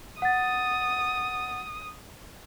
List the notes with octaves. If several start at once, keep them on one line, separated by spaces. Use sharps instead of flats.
F#5 D#6 A6